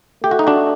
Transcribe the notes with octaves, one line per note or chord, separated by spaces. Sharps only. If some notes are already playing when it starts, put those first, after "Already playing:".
A3 G4
F#4
D#4
D4 F#4